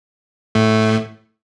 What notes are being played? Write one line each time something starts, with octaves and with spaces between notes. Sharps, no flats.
A2 A3